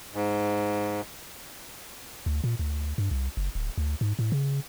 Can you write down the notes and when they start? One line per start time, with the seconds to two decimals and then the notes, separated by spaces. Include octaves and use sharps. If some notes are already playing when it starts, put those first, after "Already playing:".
0.14 G#2
2.26 D2
2.44 A#2
2.59 D2
2.98 G2
3.11 C2
3.37 F#1
3.55 D1
3.78 D2
4.01 G#2
4.19 A2
4.32 C#3